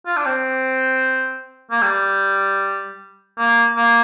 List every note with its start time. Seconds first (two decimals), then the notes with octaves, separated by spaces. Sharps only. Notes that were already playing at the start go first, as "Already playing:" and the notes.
0.06 F4
0.17 D4
0.26 C4
1.71 A#3
1.82 G3
3.38 A#3
3.76 A#3